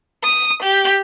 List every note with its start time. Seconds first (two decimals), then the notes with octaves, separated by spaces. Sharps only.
0.24 D#6
0.62 G4